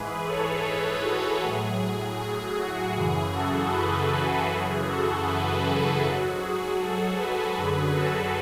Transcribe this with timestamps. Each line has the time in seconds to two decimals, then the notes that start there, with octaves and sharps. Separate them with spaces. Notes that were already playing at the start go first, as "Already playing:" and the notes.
Already playing: G#2 E3 G#4 B4
0.27 A4 C#5
0.66 G#4 B4
1.04 F#4 A4
1.42 A2 F#3 G#4
2.19 G#4
2.58 F#4
2.96 F#2 C#3 E3 G#4
3.34 F#4 A4
3.72 G#4 B4
4.11 F#4 A4
4.50 F#2 C#3 E3 G#4
4.88 F#4 A4
5.26 G#4 B4
5.65 F#4 A4
6.03 G#2 F#3 F#4
6.42 G#4
6.80 F#4 A4
7.18 G#4 B4
7.57 F#2 D3 F#3
7.95 F#4 A4